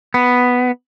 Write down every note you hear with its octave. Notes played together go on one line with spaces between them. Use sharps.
B3